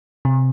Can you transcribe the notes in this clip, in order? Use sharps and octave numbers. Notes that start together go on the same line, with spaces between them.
C3